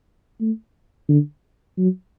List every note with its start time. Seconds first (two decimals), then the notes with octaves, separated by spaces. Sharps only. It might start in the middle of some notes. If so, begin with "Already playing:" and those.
0.41 A3
1.08 D3
1.77 F#3